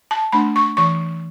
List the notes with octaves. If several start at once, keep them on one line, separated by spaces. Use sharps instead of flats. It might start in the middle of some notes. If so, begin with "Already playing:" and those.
A5
A3 D4 B5
C#6
E3 C#6